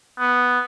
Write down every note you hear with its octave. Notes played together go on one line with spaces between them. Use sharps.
B3